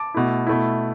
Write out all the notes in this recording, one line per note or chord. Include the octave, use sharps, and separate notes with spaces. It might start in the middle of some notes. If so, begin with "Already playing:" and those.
Already playing: A5 D6
B2 A3 E4
B2 A3 E4